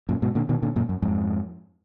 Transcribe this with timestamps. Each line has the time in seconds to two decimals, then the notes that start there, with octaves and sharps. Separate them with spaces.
0.09 F#2 A#2
0.22 G#2 B2
0.35 A#2 D3
0.49 B2 D#3
0.62 A#2 D3
0.76 F#2 A#2
0.89 F#2
1.02 F2 G#2